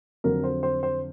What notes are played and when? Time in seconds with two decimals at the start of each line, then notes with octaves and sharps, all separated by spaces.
0.24 F2 D3 F#3 A#4
0.44 C5
0.63 C5
0.83 C5